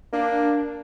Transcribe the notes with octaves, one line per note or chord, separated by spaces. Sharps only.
A#3 D4